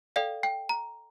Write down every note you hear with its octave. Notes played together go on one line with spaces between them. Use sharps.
A4 D5 F5 G5
G5
A#5